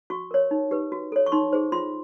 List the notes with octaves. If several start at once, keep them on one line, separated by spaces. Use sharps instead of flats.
F#4 C#6
A#4 C#5
D#4
G4 B4
F#4
A4 C#5
C#6
D#4 C6
G#4 C5
F4 C6